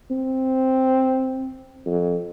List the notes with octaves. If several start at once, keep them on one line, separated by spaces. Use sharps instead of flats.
C4
F2